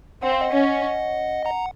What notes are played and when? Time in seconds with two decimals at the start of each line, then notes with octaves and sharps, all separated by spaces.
0.22 C4 F#5
0.32 F5
0.41 D#5 F#5
0.53 C#4
1.46 F#5 A#5